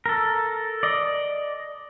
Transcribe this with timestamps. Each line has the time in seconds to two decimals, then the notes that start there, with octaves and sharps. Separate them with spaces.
0.06 A4 A#4
0.83 D5 D#5